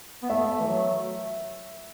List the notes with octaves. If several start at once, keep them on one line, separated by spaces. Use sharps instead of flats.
B3
A3 E5
E3
F#3